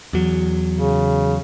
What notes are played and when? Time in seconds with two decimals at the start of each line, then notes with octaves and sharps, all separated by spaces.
0.13 E2 F#3
0.74 C#3